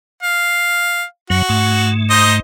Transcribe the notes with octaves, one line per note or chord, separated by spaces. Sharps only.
F5
F#2 F#3 F#4
G#2 A3
D#4 C5 D#5